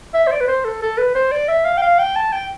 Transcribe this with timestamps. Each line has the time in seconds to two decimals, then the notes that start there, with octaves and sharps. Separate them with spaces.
0.14 E5
0.27 C5
0.32 D5
0.41 B4
0.48 C5
0.65 A4
0.82 A4
0.98 B4
1.15 C5
1.32 D5
1.48 E5
1.65 F5
1.77 G5
1.82 F5
1.99 G5
2.16 A5
2.32 G5